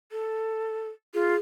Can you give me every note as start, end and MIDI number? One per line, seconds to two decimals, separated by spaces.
0.12 0.89 69
1.14 1.35 65
1.14 1.40 68